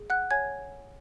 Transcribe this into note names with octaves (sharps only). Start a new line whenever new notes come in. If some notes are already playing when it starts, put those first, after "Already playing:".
Already playing: G#4
F#5 F#6
C#5 G#5 G#6